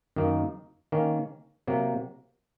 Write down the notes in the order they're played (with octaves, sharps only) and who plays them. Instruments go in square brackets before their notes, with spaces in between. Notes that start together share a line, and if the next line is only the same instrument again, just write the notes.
[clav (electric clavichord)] F#2 D#3 A#3 D#4
D#3 A#3 C#4
C3 F#3 A#3